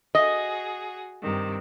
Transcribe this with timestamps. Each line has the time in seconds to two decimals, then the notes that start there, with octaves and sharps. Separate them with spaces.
0.15 F#4 G#4 D#5
1.21 G2 C3 D#3